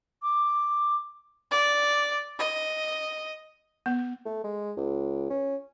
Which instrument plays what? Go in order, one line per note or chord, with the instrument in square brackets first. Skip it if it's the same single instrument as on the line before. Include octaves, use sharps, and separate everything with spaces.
[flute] D6
[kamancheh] D5
D#5
[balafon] B3
[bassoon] A3
G#3
C#2
C#4